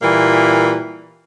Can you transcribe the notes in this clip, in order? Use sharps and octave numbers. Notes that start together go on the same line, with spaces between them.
A#2 E3 G3 A#3